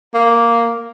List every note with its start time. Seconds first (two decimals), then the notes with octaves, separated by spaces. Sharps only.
0.14 A#3